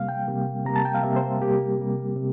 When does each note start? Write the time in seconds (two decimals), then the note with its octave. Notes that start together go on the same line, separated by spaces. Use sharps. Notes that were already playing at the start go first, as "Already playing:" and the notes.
Already playing: C3 G3 A#3 F5
0.09 G5
0.28 C3 G3 A#3
0.65 C3 G3 A#3 A#5
0.76 A5
0.85 G5
0.95 F5
1.03 C3 G3 A#3 E5
1.16 C5
1.41 C3 G3 A#3 G4
1.79 C3 G3 A#3
2.16 C3